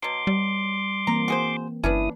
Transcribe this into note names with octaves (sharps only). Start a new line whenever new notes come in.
B2 F#3 C6 D6
G3
E3 A#3 C4 A#5
F#4 G#4 C5
G1 C#4 D4 E4 B4 D#6